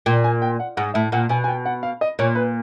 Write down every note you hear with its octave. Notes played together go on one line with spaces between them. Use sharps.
A#2 G5
G#5
G5
F#5
G#2 F#5
A2 E5
A#2 F#5
B2 G#5
G#5
G5
F#5
F5
D#5
A#2 C#5
B4